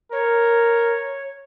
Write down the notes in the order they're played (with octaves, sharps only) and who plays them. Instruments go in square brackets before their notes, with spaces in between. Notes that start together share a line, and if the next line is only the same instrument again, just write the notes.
[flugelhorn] A#4 [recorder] C#5